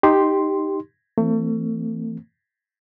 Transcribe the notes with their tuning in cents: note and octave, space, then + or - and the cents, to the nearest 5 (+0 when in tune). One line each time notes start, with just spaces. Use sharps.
D#4 +0 G4 +0 C6 +0
E3 +15 A3 +35 C4 +0